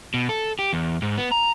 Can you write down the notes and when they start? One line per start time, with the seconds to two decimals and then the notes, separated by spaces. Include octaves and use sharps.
0.14 B2
0.29 A4
0.59 G4
0.73 E2
1.02 G#2
1.18 B3
1.32 A#5